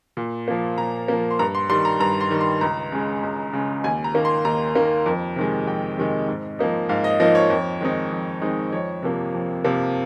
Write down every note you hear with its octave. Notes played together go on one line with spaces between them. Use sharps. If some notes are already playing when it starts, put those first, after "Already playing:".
A#2
F3 A#3
A#2 A#5
F3 A#3
C6
G2 A#5
C6
D#3 G3 C6
A#5
G2 A#5
C6
D#3 G3
C6
C#2 A#5
C#3 G#3
C#2
C#3 G#3
D#2 G#5
A#5
D#3 A#3
C6
D#2 A#5
D#3 A#3
F2
C3 D#3 G#3
F2 G5
C3 D#3 G#3
G#2
F3 A#3 D#4
G#2 F5
D#5
F3 A#3 D#4 D#5
C#5
F2
D#3 G#3 C4 D#4
F2
D#3 G#3 C4 D#4
F2 C#5
C3 F3 A#3
F2
C3 F3 A#3